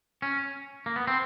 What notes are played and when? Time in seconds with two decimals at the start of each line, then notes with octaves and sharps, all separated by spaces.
0.22 C#4
0.86 A#3
0.96 B3
1.07 C4